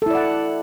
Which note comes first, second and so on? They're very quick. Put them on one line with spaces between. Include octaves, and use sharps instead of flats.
A4 E4 D5 F#5